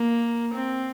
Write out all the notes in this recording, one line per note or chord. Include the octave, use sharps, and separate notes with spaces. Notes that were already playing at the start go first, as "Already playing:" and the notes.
Already playing: A#3
C4